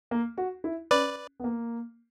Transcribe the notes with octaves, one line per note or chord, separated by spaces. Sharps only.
A#3
F#4
E4
C#4 B4 D5
B3
A#3